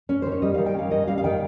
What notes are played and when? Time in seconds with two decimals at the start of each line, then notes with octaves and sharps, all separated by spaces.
0.09 C#4
0.22 D#3 C5
0.32 C#5
0.42 G3 D#5
0.54 D#3 F5
0.66 G5
0.74 C#4 F5
0.90 D#3 D#5
1.07 G3 F5
1.18 F5
1.24 D#3 G5